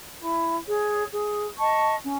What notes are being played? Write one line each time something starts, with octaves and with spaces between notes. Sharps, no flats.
E4
G#4 C#5
G#4
D#5 A5 C#6
C#4